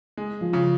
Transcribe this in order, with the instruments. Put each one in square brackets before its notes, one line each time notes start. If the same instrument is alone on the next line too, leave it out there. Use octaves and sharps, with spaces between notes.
[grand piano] G#3
[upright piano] F3
[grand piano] C#3